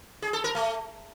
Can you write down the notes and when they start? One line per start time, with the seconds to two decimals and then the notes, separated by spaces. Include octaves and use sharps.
0.22 G#4
0.33 A4
0.44 A#4
0.55 A3